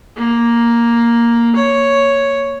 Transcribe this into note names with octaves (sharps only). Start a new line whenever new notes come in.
A#3
C#5